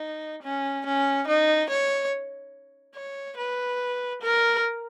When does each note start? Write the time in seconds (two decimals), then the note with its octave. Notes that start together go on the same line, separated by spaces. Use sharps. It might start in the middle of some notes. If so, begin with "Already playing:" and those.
Already playing: D#4
0.43 C#4
0.85 C#4
1.27 D#4
1.69 C#5
2.95 C#5
3.37 B4
4.21 A#4